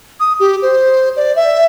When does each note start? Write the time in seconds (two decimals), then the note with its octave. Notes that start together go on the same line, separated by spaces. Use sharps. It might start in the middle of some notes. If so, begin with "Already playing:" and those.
0.20 D#6
0.40 G4
0.62 C5
1.17 D5
1.36 E5